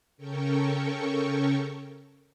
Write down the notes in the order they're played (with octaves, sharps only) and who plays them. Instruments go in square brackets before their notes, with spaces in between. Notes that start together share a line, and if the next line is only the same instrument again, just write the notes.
[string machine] C#3 C#4 A4 A#4 G5 C#6